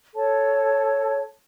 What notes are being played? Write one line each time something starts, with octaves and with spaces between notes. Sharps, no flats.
A4 C#5 A5